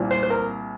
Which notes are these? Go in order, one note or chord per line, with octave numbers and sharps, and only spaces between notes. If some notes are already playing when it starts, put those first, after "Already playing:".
Already playing: C2 A#2
C5
C5
A#4